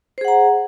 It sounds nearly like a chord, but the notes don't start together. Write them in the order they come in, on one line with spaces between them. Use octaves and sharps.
C5 G#4 F#5 A#5